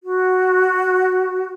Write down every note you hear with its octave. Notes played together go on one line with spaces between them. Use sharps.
F#4